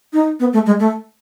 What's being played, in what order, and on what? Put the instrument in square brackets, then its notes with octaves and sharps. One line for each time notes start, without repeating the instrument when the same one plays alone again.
[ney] D#4
B3
A3
G#3
A3